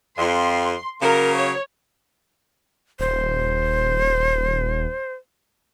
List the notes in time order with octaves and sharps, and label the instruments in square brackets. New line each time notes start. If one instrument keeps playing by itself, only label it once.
[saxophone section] F2 [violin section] C6
[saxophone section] C#3 F#3 A#3 [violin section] A#4
[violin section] C#5
[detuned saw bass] D#1 [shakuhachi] C5